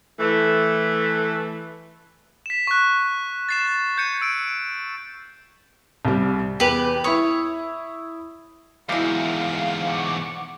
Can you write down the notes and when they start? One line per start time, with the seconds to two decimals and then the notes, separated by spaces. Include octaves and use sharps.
0.20 E3 A3
2.46 B6 E7
2.67 C#6 F#6
3.49 A6 C7 E7
3.68 A6
3.98 G6 G#6 C7 C#7 D#7
4.21 E6 D7
6.05 C2 G3
6.60 E2 G4 B4
7.04 E4 C#5 B5 D#6
8.89 E2 G#2 E4 F#4 G4 A#4 E5 F5
9.85 F#5 C#6 D6